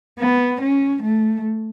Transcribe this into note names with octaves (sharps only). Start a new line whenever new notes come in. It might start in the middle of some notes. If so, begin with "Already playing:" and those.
B3
C#4
A3